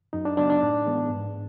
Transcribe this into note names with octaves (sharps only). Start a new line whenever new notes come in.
F#2 D#4
D4
C#3 F#3 B3 D4
D4
A2
E3 G#3 B3
G#2